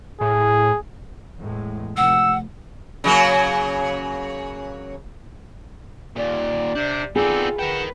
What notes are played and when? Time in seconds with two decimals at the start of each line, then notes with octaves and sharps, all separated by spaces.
0.21 A2 G#4
1.40 E2 A2 G#3
1.97 F1 F#5 E6
3.04 C#3 F#3 A#3
6.16 D#2 A#2 D5
6.75 C3 D4 C5
7.16 B3 C4 D#4 F4 G#4 A4 D5
7.59 A#4 B4 F#5 G5 A5